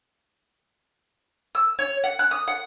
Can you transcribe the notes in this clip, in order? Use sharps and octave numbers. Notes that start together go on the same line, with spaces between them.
E6
C#5
F#5
F#6
D#6
F#5